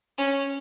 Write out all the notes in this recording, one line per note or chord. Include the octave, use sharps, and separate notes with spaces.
C#4